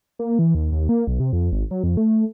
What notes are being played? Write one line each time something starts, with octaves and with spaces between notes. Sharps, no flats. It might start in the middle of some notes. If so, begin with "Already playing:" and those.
A#3
E3
D#2
D#2
A#3
B1
C3
F2
G#1
F#3
F2
A3